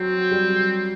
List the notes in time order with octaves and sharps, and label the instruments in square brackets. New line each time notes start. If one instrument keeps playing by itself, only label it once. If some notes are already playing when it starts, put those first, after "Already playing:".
Already playing: [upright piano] F#3 [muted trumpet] C4
[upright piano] G3